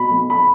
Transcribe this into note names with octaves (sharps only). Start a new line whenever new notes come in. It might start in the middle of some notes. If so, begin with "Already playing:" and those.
Already playing: B2 B5
B1
B5